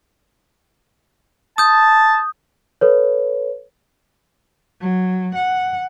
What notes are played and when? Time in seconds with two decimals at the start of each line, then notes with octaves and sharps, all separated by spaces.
1.58 A5 D#6 G6
2.81 A4 B4 C#5
4.81 F#3
5.35 F#5